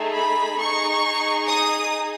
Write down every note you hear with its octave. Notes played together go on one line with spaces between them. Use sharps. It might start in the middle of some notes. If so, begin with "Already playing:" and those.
Already playing: A3 D#4 G#4
B5
D#4 G#4 C#6
D#6